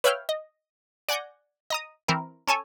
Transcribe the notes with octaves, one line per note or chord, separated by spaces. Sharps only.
B4 C#5 E5 F5 G5 F6
D#5
D5 F#5 G#5 G6 A#6
D#5 A#5 D#6
E3 C4 E4 A#4
C#4 A4 C#5 G#5